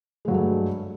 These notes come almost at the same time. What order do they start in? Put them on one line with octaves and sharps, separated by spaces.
G#3 F#3 G2 A3